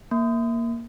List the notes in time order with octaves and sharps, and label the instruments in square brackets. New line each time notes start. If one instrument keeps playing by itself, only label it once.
[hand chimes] A#3